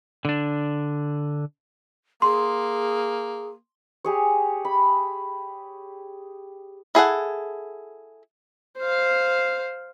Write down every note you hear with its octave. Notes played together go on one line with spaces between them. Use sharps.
D3 D4
A#3 G#4 C6
G4 G#4 C#5
B5
E4 G#4 A4 F#5
C5 F5